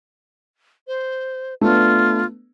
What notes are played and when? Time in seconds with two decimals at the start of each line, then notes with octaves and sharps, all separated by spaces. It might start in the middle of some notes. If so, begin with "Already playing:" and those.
0.87 C5
1.61 A3 B3 D4 F4